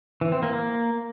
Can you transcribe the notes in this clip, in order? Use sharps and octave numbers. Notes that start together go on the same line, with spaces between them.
E3
C4
A#3
A#3